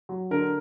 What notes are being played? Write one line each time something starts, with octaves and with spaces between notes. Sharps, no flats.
F#3
D3 A#4